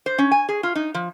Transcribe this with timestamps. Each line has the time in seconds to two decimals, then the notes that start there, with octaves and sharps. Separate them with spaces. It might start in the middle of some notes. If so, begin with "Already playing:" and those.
0.06 C5
0.18 C#4
0.31 G#5
0.49 G#4
0.63 F4
0.75 D#4
0.94 F3